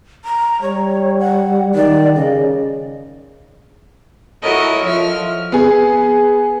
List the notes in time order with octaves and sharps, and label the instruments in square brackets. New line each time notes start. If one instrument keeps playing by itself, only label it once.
[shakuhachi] A#5
[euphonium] G3 [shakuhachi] C#5
[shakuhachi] F#5
[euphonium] D#3 [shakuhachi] D5
[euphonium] C#3 [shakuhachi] D#5
[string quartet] E4 F#4 A4 A#4 C#5 D#5
F3 E5 F6
[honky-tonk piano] B3 G#4